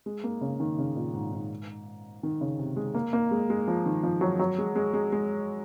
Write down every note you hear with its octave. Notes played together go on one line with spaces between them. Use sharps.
G#3
A#3
C#3
D#3
C#3
A#2
G#2
G#2
D#3
C#3
C3
G#3
A#3
A#3
G#3
G#3
F3
D#3
F3
F#3
F#3
G#3
G#3
G#3
G#3